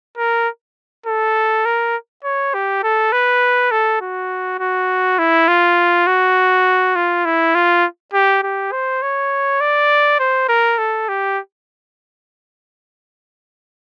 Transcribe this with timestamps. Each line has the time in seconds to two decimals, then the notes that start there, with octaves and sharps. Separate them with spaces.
0.17 A#4
1.06 A4
1.65 A#4
2.24 C#5
2.54 G4
2.83 A4
3.12 B4
3.71 A4
4.01 F#4
4.59 F#4
5.18 E4
5.48 F4
6.07 F#4
6.95 F4
7.25 E4
7.55 F4
8.13 G4
8.43 G4
8.72 C5
9.02 C#5
9.61 D5
10.19 C5
10.48 A#4
10.78 A4
11.08 G4